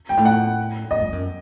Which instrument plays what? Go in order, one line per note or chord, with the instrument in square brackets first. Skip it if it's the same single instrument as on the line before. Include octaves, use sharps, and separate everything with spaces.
[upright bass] G#2 [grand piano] G5
[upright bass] A2
[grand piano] F#5
[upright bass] G#2 [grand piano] D#5
[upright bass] G2
F#2